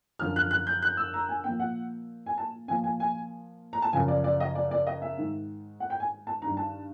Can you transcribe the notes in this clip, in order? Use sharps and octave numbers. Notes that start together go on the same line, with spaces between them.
F#2 D3 F3 F6
F#6
F#6
G6
F#6
E6
A#5
G#5
A#2 F3 G5
F#5
G#5
A5
A#2 F3 G#5
G#5
G#5
A#5
A5
F#2 C#3 F3 G#5
D5
D5
D#5
D5
D5
D#5
E5
G#2 D#3
F#5
G5
G#5
A5
G2 D#3 A#5
A5